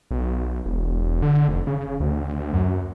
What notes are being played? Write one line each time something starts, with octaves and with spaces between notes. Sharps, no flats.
B1
E1
D3
F1
C#3
D2
F#2